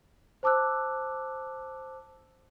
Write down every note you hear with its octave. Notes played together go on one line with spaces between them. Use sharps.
C5 A5 D6 E6 F#6